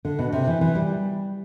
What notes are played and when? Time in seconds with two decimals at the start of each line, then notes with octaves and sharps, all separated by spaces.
0.05 D3
0.19 B2
0.33 C3
0.47 E3
0.61 E3
0.75 G3